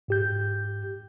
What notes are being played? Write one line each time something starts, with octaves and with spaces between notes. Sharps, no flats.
G#2 G4 G6